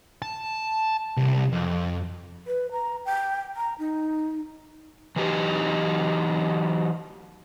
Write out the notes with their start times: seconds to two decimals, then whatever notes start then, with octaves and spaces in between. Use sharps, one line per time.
0.22 A5
1.17 C2
1.52 F2
2.47 B4
2.72 A#5
3.05 G5
3.57 A#5
3.79 D#4
5.16 E3 F#3 D#4 G4 B4